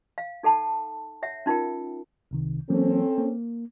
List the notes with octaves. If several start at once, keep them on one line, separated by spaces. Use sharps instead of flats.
F5
D#4 A4 F#5 A5
C#5 E5 F#5
C#4 D#4 F4 A#4 G5
C2 C3 D#3
E3 F#3 A#3 C4 C#4 A4
A#3